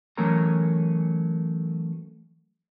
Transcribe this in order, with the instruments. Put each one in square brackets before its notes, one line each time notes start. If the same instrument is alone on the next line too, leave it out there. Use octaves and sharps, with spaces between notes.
[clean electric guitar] E3 F#3 A3 C#4 A#4 A#5